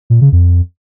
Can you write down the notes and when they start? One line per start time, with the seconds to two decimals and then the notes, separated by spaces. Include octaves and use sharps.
0.10 A#2
0.21 C#3
0.32 F2